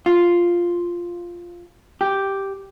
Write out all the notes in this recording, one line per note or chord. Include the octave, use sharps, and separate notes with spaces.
F4
G4